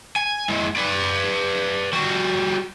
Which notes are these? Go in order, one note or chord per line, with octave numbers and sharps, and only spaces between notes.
G#5
G#3 E4
B4 D5
G3 F#4